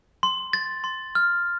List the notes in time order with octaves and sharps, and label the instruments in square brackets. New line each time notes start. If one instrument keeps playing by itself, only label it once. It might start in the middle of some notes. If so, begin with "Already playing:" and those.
[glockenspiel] C6
A6
C6
F6